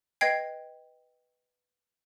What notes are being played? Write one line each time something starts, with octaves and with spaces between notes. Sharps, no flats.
B4 D#5 G5 G#6 C7